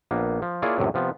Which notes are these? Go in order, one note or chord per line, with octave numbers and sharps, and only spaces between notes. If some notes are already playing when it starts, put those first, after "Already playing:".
A#1 A#3 B3
F3
A#3 E4 F4 G#4 C#5 D5
C#2 F#2 A2 C3
C3 F3 B3